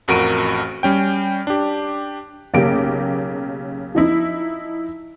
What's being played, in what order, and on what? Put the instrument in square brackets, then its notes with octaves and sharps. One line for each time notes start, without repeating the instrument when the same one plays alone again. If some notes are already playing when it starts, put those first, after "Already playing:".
[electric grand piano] A1 F2 F#4 A#4 D7 D#7
G3 C#4 G5
D4 G4
[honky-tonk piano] B1 C#3 A#3 G4 D7
F3 D#4 E4